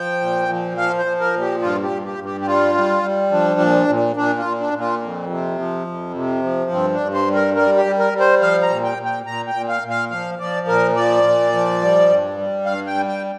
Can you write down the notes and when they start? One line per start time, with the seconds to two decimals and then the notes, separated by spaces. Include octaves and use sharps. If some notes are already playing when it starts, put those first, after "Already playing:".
Already playing: F3 G5
0.21 A#2
0.49 F3
0.77 F3 F5
0.99 C5
1.05 F3
1.20 A#4
1.34 A#2
1.41 G4
1.62 G2 F4
1.83 G4
1.90 G2
2.05 G4
2.19 G2
2.25 G4
2.41 G4
2.47 G3 F4
2.75 G3
3.04 G3
3.31 F3 D4
3.60 A#2
3.88 A#2
4.16 A#2 D4
4.38 F4
4.46 A#2
4.60 D4
4.74 A#2
4.80 F4
5.02 F2
5.30 C3
5.58 F3
5.87 F2
6.14 C3
6.43 F3
6.71 G2 C4
6.93 D4
7.00 G2
7.14 C5
7.28 G3
7.35 A#4
7.56 G3 A#4
7.77 G4
7.85 G3
7.99 A#4
8.13 G3
8.20 C5
8.41 F3 F5
8.63 A#5
8.70 A#2
8.84 G5
8.98 A#2
9.05 G5
9.26 A#2 A#5
9.47 G5
9.55 A#2
9.69 F5
9.83 A#2
9.90 F5
10.11 F3 F5
10.39 F3 D5
10.67 A#2 A#4
10.95 F3 D5
11.24 A#2
11.52 F3
11.81 G3
12.09 G2
12.37 G3
12.65 G2 F5
12.87 G5
12.95 G3
13.08 G5